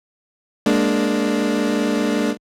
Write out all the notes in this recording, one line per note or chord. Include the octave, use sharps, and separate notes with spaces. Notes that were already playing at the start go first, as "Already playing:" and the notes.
G#3 A#3 D4